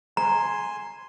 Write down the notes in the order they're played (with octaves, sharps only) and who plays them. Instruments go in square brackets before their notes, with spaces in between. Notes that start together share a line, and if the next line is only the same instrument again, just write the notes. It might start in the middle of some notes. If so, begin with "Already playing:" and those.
[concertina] G#5 C6 [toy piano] A#5